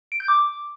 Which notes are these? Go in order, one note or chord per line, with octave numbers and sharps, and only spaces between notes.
D7
G6
D6